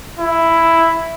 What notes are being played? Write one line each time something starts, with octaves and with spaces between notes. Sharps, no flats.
E4